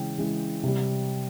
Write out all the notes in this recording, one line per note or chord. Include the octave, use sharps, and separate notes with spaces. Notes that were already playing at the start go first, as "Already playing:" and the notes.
Already playing: C#3 E3 G#3 G5
C#3 E3 G#3
C3 G3